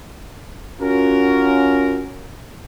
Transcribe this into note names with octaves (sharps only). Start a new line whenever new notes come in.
C#4 F4 F#4 A#4